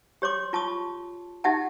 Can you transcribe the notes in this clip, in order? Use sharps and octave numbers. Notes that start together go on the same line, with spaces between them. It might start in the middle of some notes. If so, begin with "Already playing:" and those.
G4 C#5 C6 D6
F4 A5 C#6 D#6
D#4 G4 E5 F#5 A5